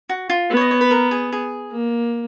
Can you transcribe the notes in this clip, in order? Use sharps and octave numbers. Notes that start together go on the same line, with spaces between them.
F#4
F4
B3
C#5
D#5
C#5
B4
A#4
G#4
G#4
A#3